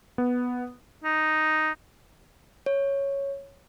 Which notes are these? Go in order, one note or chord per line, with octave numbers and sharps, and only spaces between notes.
B3
D#4
C#5